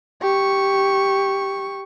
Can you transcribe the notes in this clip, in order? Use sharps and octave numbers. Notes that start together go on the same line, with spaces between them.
G4 C#6